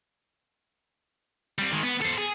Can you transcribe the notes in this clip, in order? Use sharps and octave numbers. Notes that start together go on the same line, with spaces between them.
G3 C4
D#3 G#3
B3
A4 C5
G#4